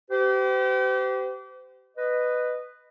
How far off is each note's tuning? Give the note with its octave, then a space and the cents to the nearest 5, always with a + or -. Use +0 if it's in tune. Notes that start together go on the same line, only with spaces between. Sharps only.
G4 -30 C5 -45
B4 +5 D#5 -15